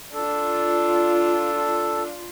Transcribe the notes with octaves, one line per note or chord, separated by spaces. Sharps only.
D4 F4 A4